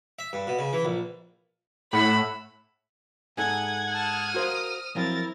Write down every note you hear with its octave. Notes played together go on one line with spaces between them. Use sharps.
E5
G2
B2
C#3
E3
A#1
A2 F#5 B5 E6
G#2 D#4 A4 F#5 G#5 G#6
A5 D#6 F6
F#4 A#4 C5 F5
F3 F#3 C4 E4 A#4 A6